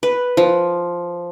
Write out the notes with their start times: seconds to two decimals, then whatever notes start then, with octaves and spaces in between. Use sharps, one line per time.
0.03 B4
0.37 F3